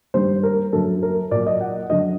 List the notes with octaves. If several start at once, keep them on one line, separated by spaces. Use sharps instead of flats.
G2 D#3 G3 C5
A#4
F#2 D3 F#3 A4
A#4
A#2 F#3 D5
D#5
F#5
F#2 D3 F#3 D#5